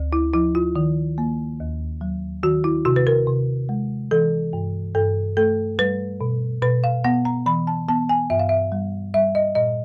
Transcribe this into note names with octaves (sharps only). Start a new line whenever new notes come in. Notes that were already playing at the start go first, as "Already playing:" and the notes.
Already playing: D2
E4
F3 E4
F4
D#3
A#3
D#2
F#3
D#3 F#4
E4
C3 F#4
B4
A#4
C3
G#3
E3 A4
G2
G2 A4
A3 A4
G3 B4
B2
B2 B4
F5
B3 F#5
A#5
E3 B5
A5
B3 A5
G#5
G2 E5
F5
E5
G3
G3 E5
D#5
A#2 D#5